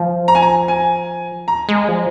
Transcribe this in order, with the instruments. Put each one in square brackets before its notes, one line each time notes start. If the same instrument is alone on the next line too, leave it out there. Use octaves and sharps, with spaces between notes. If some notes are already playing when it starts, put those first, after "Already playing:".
Already playing: [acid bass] F3
[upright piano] A#5
G#5
A#5
G#5
A#5
[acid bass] G#3
[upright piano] G#5
[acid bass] F3